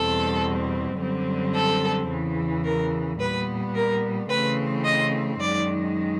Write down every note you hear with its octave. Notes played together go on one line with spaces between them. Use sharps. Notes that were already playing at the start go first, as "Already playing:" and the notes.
Already playing: E2 B2 G3 C4 A4
F#2 D3 G3 C4
A4
E2 C#3 E3
A#4
A#2 G3 B3 B4
A#4
C#3 E3 A3 C4 B4
D#5
F#2 D#3 G#3 D5